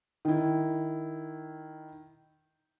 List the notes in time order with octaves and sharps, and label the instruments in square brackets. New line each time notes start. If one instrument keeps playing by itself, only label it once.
[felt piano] D#3 E4